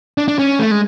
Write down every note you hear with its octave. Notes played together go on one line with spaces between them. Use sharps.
D4
D4
C#4
A3
G#3